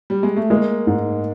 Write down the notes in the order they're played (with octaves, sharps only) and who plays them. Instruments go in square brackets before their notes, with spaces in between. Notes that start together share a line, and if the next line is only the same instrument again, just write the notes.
[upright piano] G3
G#3
A3
[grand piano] G#3 [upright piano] A#3
[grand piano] G#2